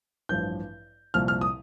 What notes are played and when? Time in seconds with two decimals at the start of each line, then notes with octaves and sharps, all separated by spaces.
0.29 A1 G2 F3 G6
1.14 C2 A#2 F3 F6
1.28 F6
1.41 D#6